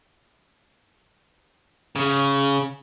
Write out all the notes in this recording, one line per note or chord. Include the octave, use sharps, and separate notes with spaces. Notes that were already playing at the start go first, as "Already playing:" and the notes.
C#3